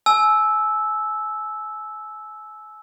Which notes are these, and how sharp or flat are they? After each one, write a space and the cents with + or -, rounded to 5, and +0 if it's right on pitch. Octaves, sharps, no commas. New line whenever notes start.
G#5 +35 E6 -10